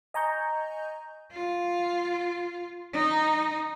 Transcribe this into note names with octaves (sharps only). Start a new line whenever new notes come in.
D#5 G#5 A#5 C#6 G6
F4
D#4